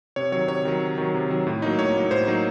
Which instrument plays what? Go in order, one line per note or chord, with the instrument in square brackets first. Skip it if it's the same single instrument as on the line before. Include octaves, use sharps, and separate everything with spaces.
[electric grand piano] C3 C#5
D#3 F#3 C#5
C3 C#5
D#3 F#3
C3
D#3 F#3
C3
D#3 F#3
A2
F#3 A#3 D#4
A2 C#5
F#3 A#3 D#4
A2 C5
F#3 A#3 D#4